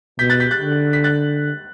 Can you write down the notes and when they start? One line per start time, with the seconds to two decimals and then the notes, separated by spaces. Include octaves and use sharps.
0.19 B2 G6 B6
0.30 F#6 A6
0.40 G6 B6
0.51 F#6 A6
0.61 D3
0.93 B6
1.04 F#6 A6